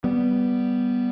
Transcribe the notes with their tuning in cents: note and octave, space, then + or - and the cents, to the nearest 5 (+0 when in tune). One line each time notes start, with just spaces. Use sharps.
G3 +0 B3 +0